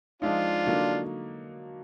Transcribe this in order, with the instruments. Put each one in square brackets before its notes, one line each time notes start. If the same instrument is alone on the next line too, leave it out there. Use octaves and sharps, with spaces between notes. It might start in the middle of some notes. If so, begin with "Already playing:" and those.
[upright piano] F3 G#3 D#4 [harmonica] D4 F4
[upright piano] D3 F#3 A#3 D#4